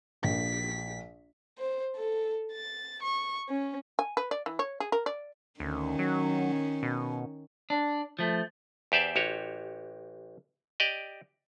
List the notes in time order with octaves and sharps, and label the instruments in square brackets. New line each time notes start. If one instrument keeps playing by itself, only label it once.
[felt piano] A#1 [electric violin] B6
[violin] C5
A4
A6
C#6
C#4
[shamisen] G#5
B4
D5
E3
C#5
G#4
A#4
D5
[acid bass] D2 [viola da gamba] D#3 C#4
[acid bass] F#3
B2
[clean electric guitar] D4
F3 A3
[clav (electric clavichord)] E2 G4 C5 D5 E5
A1 F#4 G4 C#5
G4 D5 D#5